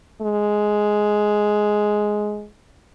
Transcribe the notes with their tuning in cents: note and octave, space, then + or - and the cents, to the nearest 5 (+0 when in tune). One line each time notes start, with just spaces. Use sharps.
G#3 +5